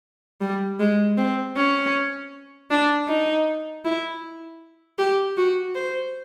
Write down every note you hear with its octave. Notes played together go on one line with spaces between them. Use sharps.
G3
G#3
C4
C#4
D4
D#4
E4
G4
F#4
C5